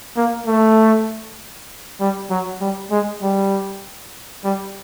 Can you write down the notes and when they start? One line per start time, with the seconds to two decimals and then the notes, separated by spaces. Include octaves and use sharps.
0.16 A#3
0.47 A3
2.00 G3
2.30 F#3
2.61 G3
2.91 G#3
3.22 G3
4.44 G3